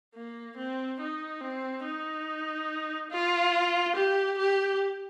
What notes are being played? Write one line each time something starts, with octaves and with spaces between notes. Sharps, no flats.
A#3
C4
D#4
C4
D#4
F4
G4
G4